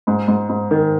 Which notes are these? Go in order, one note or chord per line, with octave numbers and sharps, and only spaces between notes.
G#2
G#2
G#2
D#3